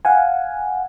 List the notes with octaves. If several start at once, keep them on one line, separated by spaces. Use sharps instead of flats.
F5 F#5 G#5